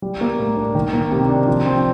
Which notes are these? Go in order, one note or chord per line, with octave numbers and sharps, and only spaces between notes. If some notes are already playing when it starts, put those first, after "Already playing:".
G3
A#3
A2
D4
D#3
A#3
C3
D4
F3
C4